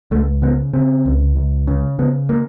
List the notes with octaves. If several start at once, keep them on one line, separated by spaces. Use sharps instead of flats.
C#2 A3
C#3 B3
C#3 C4
C#2
C#2
C#3
C#3 B3
A#3